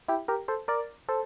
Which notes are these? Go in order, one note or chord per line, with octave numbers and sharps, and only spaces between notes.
E4 G4
G4 A#4
A4 C5
A#4 D5
A4 C5